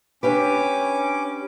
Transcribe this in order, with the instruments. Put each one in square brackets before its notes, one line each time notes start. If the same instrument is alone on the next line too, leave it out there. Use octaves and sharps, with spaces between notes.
[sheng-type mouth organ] C#4 D6 [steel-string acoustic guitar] D4 G4 B4